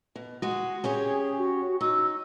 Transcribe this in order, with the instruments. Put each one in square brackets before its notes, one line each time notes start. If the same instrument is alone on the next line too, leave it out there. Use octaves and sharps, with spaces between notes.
[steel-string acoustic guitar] B2
G#3 F#4
[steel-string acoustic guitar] C#4 G4 C#5 [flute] G#4
[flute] F#4
[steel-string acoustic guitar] D#4 [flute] E6